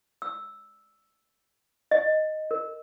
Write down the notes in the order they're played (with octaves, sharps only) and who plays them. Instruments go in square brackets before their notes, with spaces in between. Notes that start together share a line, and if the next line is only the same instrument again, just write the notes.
[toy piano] E6
D#5
A#4